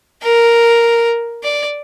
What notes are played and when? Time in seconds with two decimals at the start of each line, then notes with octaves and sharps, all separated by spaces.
0.23 A#4
1.44 D5